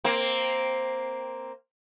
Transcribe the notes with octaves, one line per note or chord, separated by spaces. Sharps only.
A#3 C4